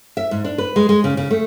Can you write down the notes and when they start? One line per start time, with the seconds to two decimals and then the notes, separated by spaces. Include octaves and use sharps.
0.17 E5
0.31 G#2
0.44 D4
0.58 B4
0.76 G#3
0.89 G#3
1.04 C#3
1.17 C#3
1.31 A3